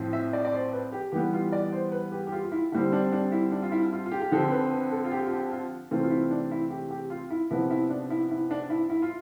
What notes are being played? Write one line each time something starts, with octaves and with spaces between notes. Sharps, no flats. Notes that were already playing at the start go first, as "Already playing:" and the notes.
Already playing: A2 F3 C4
E5
D5
D5
C5
B4
G4
E3 G3 B3 G4
F4
D5
C5
B4
G4
G4
F4
F4
E4
D3 G3 C4 E4
D4
D4
E4
D4
F4
E4
F4
F4
G4
G4
D3 F3 C4 A4
B4
B4
A4
F4
G4
F4
G4
F4
C3 E3 A3 C4 F4
F4
E4
D4
E4
G4
G4
F4
E4
C3 F3 B3 E4
E4
D4
E4
E4
D4
E4
E4
F4